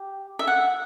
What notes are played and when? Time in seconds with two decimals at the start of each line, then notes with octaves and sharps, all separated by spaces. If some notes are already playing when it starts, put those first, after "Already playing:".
Already playing: G4
0.39 E5
0.47 F#5